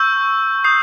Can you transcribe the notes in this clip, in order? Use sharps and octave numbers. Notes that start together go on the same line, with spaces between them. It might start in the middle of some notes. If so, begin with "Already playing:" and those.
Already playing: C#6 E6 G6
D#6 G6 C7